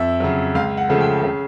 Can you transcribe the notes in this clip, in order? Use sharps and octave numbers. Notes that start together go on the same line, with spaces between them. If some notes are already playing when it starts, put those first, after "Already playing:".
Already playing: F2 E5
C#3 F#3
C#2 F5
F#5
C#3 F3 A3
G5
C#3